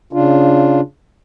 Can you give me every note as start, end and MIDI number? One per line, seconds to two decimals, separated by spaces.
0.13 0.81 49
0.13 0.81 62
0.13 0.81 65